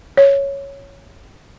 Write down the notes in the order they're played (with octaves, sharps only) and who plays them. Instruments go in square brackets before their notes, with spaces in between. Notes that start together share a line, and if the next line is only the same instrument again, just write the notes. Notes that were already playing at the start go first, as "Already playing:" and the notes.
[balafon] C#5